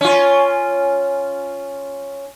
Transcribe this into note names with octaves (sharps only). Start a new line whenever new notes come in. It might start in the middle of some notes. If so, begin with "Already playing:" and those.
C#4 F4